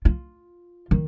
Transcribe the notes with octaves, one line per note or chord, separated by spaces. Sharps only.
F4
D#3